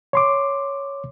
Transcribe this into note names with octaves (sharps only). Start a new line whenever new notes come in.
C#5 C6 D6